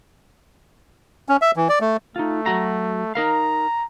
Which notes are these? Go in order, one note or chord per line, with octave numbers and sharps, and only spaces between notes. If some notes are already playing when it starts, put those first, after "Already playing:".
C#4
E5
E3
D5
A3
A3 D#4 F4
F#3 F#4 A#5
D#4 A#4 F5 A#5